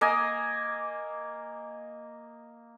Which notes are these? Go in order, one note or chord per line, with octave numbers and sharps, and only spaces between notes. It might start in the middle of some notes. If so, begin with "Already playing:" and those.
A#3 D#5 G#5